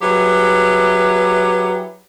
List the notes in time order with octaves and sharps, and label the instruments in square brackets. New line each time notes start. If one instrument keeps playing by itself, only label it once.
[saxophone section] F#3 E4 G4 G#4 B4